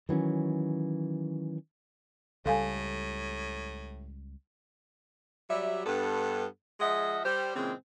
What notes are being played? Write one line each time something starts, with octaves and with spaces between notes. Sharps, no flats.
D#3 E3 F#3 C#4
C#2 A2 G3 A4 F5 G#5
F#3 G3 E5
G2 B3 A4
F3 G#3 G#4 D#5 E5 F#5
G3 G4 C5
A#2 C#3 E3 G#3 C4